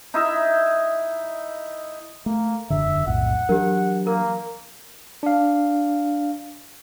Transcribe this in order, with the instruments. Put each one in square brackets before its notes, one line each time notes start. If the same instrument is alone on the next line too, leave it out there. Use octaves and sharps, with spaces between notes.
[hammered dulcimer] D#4 E4 D#5 E5
[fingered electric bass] A3 [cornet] A#3
[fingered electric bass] E1 F#2 D3 [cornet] E5
[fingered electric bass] B1 F2 A2 [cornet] F#5
[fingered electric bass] E3 F#3 D4 [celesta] G4 A#4
[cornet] A#3 [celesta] A#4
[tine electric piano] D4 F5